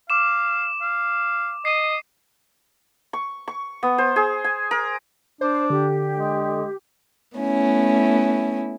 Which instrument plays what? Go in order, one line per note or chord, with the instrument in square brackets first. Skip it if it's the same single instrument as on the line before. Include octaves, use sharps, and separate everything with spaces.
[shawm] F5 [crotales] D6 E7
[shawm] F5
[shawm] D#5 [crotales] C7 D#7
[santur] C#6
C#6
B3
C5
G#4
G#5
A#4
[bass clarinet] D4 [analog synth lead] C5
[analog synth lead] D3 [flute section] G4
[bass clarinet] G#3
[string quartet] A3 B3 C#4 E4